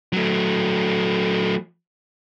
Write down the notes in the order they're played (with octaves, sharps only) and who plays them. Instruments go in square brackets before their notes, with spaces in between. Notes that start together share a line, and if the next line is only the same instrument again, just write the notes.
[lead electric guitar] F#3 A3